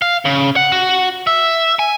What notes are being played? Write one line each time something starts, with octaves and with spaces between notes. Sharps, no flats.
F5
C#3
F#5
F#4
E5
G#5